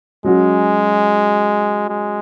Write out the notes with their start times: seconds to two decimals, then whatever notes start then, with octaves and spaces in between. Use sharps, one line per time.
0.24 F#3 G#3 C#4 F#4
1.89 G#3